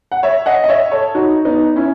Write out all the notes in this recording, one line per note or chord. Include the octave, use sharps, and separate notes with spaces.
F#5
C#5 E5
D#5 F#5
D#5
C#5 E5
A4 C#5
D#4 F#4
B3 D#4
C#4 E4